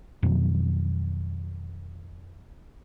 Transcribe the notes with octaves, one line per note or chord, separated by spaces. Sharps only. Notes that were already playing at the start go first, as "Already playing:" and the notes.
F2 B2 D#3 F#3